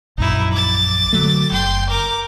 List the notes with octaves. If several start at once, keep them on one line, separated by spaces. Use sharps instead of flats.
A#1 F#2 D#4 E4
D6 A6
D3 F#3 A3
F#1 G5 C6
A#4 D6